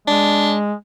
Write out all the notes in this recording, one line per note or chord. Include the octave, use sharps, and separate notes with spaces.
G#3 D4